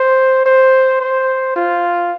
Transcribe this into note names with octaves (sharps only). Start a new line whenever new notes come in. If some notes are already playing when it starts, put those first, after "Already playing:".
Already playing: C5
C5
C5
F4